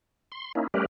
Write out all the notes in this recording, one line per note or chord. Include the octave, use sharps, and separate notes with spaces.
C6
A#3 C#4 D#4 E4
G3 A3 C#4 G4 A#4 B4